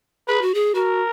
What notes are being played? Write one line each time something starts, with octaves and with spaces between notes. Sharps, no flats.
G#4 B4
F#4
G#4
F#4 A#4